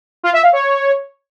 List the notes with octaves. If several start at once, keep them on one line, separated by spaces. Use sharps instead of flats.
F4
E5
F5
C#5